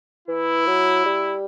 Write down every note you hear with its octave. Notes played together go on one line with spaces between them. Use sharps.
E3 E4
F#3
G3